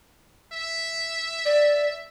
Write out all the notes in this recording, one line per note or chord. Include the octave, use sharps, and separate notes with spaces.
E5
D5